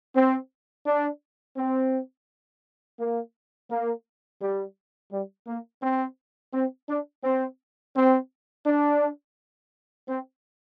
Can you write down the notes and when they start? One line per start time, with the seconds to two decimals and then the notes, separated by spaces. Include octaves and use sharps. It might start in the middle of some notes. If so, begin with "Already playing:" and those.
0.15 C4
0.87 D4
1.57 C4
2.99 A#3
3.70 A#3
4.42 G3
5.12 G3
5.47 A#3
5.83 C4
6.54 C4
6.89 D4
7.24 C4
7.96 C4
8.66 D4
10.08 C4